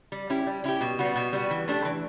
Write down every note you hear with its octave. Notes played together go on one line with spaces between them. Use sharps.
G3
C#4 E4 G4
G3
C#4 E4 G4
B2
G3 B3 F#4
B2
G3 B3 F#4
E3
A3 D4 G4
E3